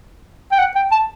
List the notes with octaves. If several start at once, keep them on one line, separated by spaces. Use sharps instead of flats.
G5
F#5
G5
A5